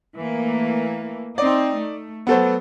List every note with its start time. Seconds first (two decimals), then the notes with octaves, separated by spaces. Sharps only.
0.17 E3 A3 A#3
1.38 C4 D#4 D5
1.78 A3
2.27 F#3 B3 A4 C5